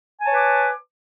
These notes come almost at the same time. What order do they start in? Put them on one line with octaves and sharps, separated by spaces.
G#5 A5 C#5 B4 D6